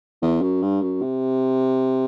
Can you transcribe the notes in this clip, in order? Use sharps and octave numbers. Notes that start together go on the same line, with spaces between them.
E2
F#2
G2
F#2
C3